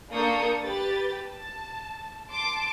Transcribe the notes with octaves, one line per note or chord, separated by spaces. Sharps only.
A#3 D4 A4 C#6 D#6 G6
G4 B4 A6
A5
A5 C6 D6